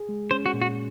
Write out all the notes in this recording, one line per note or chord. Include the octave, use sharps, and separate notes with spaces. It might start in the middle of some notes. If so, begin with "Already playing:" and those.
Already playing: G#4
G#3
C#4 C5
F#4
A#2
F#4